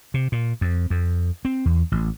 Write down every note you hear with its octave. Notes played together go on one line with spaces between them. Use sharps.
C3
A#2
F2
F2
C4
E2
A1